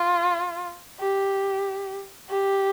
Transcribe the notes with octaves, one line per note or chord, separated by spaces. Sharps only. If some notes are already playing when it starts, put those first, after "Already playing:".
Already playing: F4
G4
G4